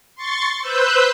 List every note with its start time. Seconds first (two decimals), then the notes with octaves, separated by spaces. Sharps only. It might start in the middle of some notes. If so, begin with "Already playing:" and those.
0.16 C6 C#6 A6
0.62 B4 C5 E6 F#6 G6